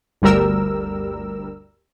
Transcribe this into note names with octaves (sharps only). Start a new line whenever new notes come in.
G1 D2 G3 A#4 E6